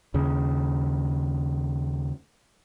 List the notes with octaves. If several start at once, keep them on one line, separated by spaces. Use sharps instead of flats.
D#2 C#3